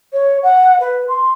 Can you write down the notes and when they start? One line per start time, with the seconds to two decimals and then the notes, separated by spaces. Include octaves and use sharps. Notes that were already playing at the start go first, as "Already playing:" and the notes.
0.13 C#5
0.43 F#5
0.80 B4
1.08 C6